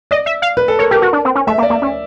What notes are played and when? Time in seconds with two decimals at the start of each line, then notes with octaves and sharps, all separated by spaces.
0.11 D5 D#5
0.26 E5
0.42 F5
0.57 B4
0.68 A4
0.79 A#4 C#5
0.91 G4 A#4
1.02 F#4
1.13 D4
1.25 C4
1.35 C#4
1.47 A3 E5
1.58 A#3
1.63 D5
1.70 A#3
1.82 C#4